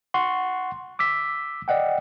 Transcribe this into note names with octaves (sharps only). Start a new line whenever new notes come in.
F#5 C6 C#6
D6 E6 B6
D5 D#5 F#5 G5